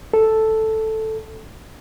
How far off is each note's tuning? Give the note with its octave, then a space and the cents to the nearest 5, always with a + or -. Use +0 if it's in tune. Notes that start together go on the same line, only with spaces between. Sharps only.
A4 +0